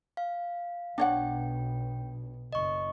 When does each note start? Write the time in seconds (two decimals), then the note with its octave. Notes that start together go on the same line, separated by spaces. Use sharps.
0.17 F5
0.98 B1 B2 D4 C#5 F#5 G5
2.53 F#1 D#5 C#6